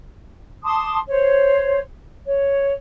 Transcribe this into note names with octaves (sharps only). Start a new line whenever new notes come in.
A5 C6 D6 D#6
C5 C#5
C#5